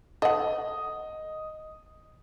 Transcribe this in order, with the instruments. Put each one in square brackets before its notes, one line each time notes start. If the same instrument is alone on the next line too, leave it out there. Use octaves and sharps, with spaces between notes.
[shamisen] A4 F#5 [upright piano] D#5